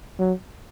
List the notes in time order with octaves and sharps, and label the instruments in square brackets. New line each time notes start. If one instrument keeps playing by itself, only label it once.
[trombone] F#3